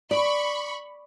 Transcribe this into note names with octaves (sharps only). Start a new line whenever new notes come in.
D5 B5 C#6